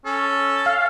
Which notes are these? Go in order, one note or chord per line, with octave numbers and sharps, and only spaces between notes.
C#4 A4
F5